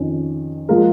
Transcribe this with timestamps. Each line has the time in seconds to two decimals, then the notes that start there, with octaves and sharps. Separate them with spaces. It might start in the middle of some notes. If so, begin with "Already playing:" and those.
Already playing: F2 D#3 C#4
0.69 F3 G#3 F4 A#4